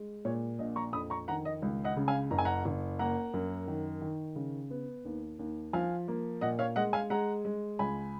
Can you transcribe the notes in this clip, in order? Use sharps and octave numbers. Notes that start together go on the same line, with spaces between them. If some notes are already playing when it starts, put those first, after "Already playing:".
Already playing: G#3
A#2 C#5
A#1 D#5
A#5 C#6
F2 B5 D#6
A#5 C#6
D#3 F#5 A#5
D#5
C#2
D#5 F#5
C#3
F5 G#5
F#1 A#5
G#5
F#5 A#5
F#1
A#3 F#5 A#5
F#2
D#3
D#3
C#3
B3
D#2
D#2
F3 F5 G#5
A#3
A#2 D#5 F#5
C#5 F5
G#3 D#5 F#5
F5 G#5
G#3 F#5 A#5
G#3
C#2 G#5 B5